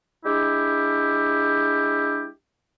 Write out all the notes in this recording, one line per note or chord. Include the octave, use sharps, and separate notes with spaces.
G#3 D4 E4 G4